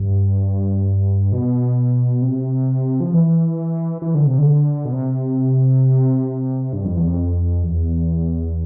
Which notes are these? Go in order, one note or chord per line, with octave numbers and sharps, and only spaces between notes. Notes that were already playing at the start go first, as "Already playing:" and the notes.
Already playing: G2
B2
C3
F3
E3
E3
D3
C3
D3
B2
C3
G2
F2
E2
F2
E2